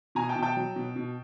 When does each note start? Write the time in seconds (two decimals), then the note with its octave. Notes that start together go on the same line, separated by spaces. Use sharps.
0.15 B2 G#5 A#5
0.29 G5 A5
0.36 B2
0.43 G5 A5
0.56 F#3
0.76 B2
0.96 B2